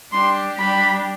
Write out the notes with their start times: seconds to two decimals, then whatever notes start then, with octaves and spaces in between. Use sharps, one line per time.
0.12 G3 D4 G4 C6
0.58 G3 D4 G4 B5